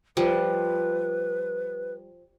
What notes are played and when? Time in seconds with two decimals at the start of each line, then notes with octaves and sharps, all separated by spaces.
0.17 F3 G3 B4